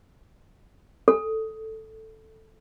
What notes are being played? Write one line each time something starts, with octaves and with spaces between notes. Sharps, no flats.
A4